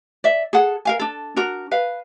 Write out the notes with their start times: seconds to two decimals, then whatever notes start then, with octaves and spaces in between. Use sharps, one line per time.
0.24 D5 E5
0.53 G#4 A4 F#5
0.85 A#4 F5 G#5
0.99 D4 A4
1.36 D4 F#4 A#4
1.71 B4 F5